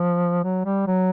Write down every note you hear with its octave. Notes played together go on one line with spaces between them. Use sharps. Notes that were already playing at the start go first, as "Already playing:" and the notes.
Already playing: F3
F#3
G3
F#3